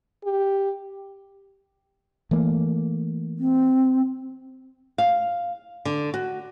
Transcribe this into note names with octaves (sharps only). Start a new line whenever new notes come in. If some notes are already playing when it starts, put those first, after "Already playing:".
G4
E3 A3 A#3
C4
F5
D3
F#4